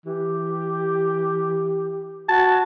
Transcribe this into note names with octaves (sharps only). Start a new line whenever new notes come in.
E3 G4
F#4 A5